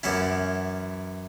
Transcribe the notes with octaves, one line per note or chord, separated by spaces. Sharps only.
F#2 E3 C#4 E4